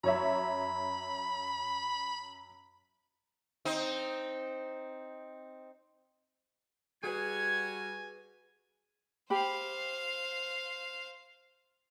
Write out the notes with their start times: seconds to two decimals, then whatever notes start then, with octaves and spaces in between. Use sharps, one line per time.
0.04 F#2 C#5 E5 B5
3.65 C4 D#4
7.04 G3 F#4 G#4 B4 G#5 G#6
9.30 G4 C5 F5 B5